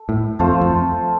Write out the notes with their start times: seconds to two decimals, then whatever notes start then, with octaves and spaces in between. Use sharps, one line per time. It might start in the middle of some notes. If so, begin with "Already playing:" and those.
Already playing: A4
0.09 A2
0.39 F2 A3 F4 A4 C5
0.61 F2